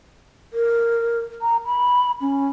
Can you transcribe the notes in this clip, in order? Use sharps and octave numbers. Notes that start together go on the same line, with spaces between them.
A#4
A#5
B5
C#4